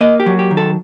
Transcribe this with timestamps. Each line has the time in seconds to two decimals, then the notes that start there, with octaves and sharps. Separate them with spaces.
0.01 A#3 D#5
0.20 G4
0.26 F#3
0.39 G4
0.51 D#3
0.57 A4